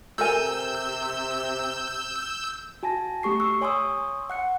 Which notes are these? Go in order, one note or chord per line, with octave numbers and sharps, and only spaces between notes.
C3 A4 A#4 G#5 E6 G6
F#4 G#5 A5 A#6
A3 G4 C#6 C7
C#6 E6 F#6
C#5 G#5 C6 C#6 D#6 E6
F#5 F#6 C#7